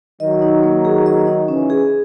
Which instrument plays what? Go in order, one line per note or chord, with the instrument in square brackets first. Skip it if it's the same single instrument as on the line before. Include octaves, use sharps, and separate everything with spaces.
[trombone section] D#3 F#3 [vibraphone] D#5
[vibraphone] D#4
A#3
G#4
D#5
D#4
[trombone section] C#3 E3 [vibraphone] C#4
[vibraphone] G#4